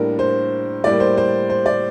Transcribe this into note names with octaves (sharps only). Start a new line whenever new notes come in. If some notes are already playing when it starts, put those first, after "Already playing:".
Already playing: A2 G3 A#3 D4 A#4
C5
A2 G3 A#3 D5
C5
C5
C5
D5